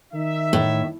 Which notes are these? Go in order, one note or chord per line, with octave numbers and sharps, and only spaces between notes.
D#3 D#4 E5
A2